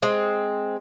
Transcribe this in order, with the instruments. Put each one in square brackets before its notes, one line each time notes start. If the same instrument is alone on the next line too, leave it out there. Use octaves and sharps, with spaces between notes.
[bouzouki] G#3 C4